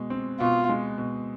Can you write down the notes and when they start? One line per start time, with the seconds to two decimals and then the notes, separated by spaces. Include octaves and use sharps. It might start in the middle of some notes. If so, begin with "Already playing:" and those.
Already playing: B2 G#3
0.10 C4
0.40 B2 F4
0.69 G#3
0.98 B2